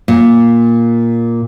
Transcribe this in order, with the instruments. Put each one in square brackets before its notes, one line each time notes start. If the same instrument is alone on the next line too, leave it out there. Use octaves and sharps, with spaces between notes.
[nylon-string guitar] A#2